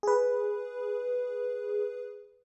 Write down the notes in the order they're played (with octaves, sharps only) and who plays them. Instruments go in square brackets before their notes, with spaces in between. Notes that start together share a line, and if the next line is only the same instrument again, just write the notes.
[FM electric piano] G#4 B4